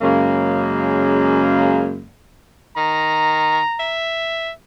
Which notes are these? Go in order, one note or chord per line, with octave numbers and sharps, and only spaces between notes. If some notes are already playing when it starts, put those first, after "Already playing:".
F#2 C#3 G#3 A#3
D#3 A#5
E5